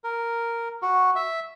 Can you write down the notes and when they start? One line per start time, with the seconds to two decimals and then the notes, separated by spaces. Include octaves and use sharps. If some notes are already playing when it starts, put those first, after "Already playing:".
0.04 A#4
0.82 F#4
1.16 E5